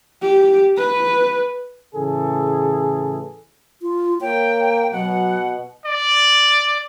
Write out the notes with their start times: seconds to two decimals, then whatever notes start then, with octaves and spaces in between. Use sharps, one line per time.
0.22 G4
0.77 B4
1.95 A2 C#3 E3 G#4 A4
3.82 F4
4.21 A#3 C#5 G5
4.93 B2 F#3 F#5
5.85 D5